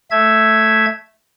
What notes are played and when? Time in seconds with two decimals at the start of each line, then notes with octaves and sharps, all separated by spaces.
0.11 A3 E5 G#6